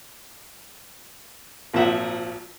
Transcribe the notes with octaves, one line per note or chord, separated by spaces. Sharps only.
G#1 A#2 F3 E5 F#5